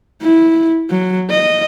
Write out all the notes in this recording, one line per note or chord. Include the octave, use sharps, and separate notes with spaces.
E4
F#3
D#5